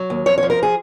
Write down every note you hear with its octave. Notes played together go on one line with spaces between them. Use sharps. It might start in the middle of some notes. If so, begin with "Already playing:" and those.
Already playing: F#3
D#2
F2 C#5
C#5
F3
A#4
G#4